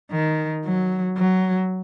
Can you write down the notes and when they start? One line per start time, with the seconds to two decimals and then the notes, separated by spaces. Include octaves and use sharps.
0.12 D#3
0.65 F#3
1.17 F#3